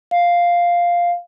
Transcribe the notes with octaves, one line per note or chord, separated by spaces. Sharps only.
F5